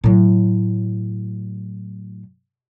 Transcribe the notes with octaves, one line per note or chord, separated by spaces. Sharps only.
A2 F#3